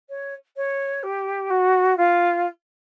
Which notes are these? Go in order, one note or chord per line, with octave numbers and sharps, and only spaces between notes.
C#5
C#5
G4
F#4
F4